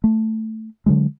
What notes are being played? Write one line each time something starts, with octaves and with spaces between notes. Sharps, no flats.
A3
D3 E3 F#3 G#3